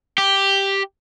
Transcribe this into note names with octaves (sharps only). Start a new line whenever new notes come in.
G4